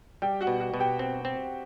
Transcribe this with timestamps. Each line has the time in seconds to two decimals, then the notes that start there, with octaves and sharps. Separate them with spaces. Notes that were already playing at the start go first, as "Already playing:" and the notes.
0.22 G3 G4 G5
0.41 F#4 F#5
0.47 B2
0.60 F#4 F#5
0.74 B2
0.79 G4 G5
0.99 C4
1.25 C4